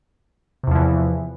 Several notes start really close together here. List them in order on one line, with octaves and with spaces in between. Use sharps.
C3 E2 F3 E3